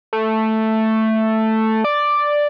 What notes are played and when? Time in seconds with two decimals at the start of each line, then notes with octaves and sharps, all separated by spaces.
0.13 A3
1.84 D5